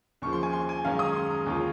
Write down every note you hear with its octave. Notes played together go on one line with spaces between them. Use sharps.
D#2 C#3 F3 C#6
C6
G#5
C6
G#5
F#2 D#3 G#3 C#4 F5
D#6
C6
A#5
D#2 C#3 G#3 C#4 F4